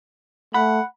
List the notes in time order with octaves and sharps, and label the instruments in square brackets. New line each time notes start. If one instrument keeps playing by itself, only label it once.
[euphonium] A3 [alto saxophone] F#5 [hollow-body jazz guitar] B5